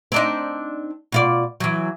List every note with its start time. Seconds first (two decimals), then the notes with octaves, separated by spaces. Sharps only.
0.12 C4 D4 D#4
1.12 B2 F4 D5
1.60 E3 F#3